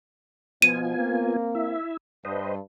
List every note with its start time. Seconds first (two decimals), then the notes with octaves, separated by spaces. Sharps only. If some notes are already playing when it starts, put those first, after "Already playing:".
0.62 B2 F3 B3 F4 G#5 D#7
0.97 A#3 C4
1.55 E4 E5
2.25 G2 B4 C5 D#5